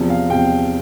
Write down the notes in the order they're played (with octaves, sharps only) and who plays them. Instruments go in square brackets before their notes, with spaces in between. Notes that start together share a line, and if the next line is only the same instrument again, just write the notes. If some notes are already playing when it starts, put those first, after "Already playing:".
Already playing: [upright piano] E2 C3 F3
F5
E2 C3 F3 G5